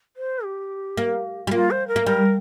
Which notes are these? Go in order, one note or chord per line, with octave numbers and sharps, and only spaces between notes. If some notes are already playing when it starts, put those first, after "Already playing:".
C5
G4
A#3
G3
A#3 F4
C5
A#4
A#3
G3 A#4